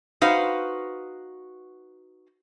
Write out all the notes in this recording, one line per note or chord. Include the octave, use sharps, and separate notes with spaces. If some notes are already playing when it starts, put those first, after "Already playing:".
D#4 F#4 B4 C5 F5